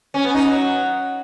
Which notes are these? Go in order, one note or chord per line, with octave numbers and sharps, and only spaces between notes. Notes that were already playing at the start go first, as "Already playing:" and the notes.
C#4
B3
D#4
F#3